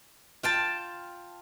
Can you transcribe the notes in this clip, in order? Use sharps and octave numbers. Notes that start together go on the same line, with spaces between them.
F4 G5 A5